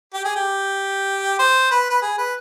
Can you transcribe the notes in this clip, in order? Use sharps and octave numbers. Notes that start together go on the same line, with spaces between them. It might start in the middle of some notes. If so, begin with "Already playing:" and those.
G4
G#4
G4
C5
B4
B4
G#4
B4